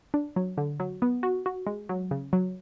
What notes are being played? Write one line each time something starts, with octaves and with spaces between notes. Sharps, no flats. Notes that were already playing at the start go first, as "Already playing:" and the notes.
D4
F#3
D3
F#3
B3
F#4
F#4
G#3
F#3
C#3
F#3